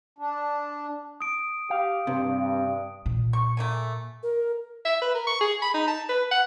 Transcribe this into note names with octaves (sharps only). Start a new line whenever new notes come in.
D4
D#6 D7
G4 F5
G2 C3
A#2
C#6
A3 A#3 G#5
A#4
E5
B4
A#4
C#6
G#4
B5
D#4
A5
B4
F#5